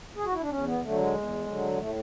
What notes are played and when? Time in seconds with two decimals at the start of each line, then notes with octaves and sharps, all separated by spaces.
0.17 G#4
0.25 F#4
0.33 E4
0.41 D4
0.50 E2 C#4
0.66 B3
0.82 D3 F#3 A3
0.98 G#3
1.14 E2
1.47 D3 F#3
1.71 G#3
1.78 A2 A3